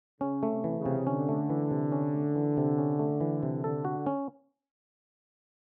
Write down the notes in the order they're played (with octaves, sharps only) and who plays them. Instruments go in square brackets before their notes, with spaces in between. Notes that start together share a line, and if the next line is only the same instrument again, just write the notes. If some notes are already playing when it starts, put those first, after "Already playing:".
[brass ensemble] C#3 [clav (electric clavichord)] C#4
[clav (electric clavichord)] A3
[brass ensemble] C3
[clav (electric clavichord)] E3
[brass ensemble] C#3
[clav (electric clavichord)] C3
[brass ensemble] D3 [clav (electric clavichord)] C#4
[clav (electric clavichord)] A3
E3
C3
C#4
A3
E3
C3
C#4
A3
E3
C3
[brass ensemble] D3 [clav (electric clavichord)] A4
[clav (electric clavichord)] F#4
C#4